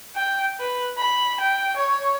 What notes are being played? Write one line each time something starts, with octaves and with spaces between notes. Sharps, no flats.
G5
B4
B5
G5
C#5